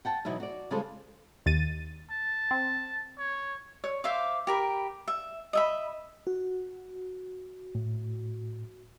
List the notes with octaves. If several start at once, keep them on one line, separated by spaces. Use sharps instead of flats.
F#5 G5 A5
B2 E3 F#3 D#4 E5
F#4 D5
C#3 G3 G#3 F4 A4 C5
D#2 A6 D#7
A5
C4
C#5
C#5
C5 E5 F5 D6
G4 A#4 B5
E5
D#5 E5 B5
F#4
A2